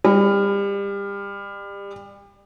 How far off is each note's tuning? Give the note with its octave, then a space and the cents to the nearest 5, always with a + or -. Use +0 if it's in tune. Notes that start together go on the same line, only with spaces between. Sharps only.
G3 +30